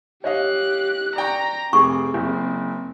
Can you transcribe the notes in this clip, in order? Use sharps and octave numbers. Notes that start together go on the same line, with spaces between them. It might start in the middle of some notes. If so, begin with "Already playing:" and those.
G4 C#5 D#5 F5 F#6
D5 G5 A#5 C#6
F1 C4 G#4 C#6 D6
F#1